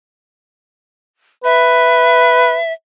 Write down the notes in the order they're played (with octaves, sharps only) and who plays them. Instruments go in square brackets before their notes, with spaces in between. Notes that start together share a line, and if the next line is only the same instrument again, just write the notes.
[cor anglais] B4 [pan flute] E5